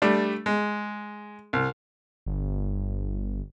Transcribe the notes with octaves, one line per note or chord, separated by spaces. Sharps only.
G3 A3 D4
G#3
C2
G1